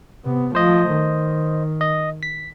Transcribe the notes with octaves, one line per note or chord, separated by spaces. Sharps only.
C3 B3
F3 A3 C5 D#5
D#3
D#5
B6